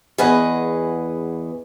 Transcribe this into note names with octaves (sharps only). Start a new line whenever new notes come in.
E2 G#4 B4 D#5 F#5 G#5